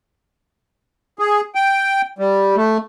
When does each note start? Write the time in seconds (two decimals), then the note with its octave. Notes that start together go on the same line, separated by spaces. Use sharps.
1.19 G#4
1.55 G5
2.19 G3
2.56 A3